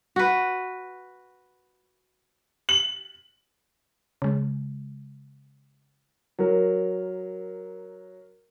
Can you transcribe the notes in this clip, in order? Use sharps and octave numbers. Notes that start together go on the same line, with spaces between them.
F#4 B4
F#7
C#3 G#3
F#3 A#4